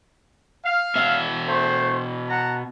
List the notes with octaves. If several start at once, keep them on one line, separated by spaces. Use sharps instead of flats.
F5
B2 E5
A3 C5
F#5 A5 A#5